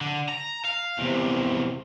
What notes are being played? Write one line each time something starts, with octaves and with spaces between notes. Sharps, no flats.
D3
A#5
F5
E2 C3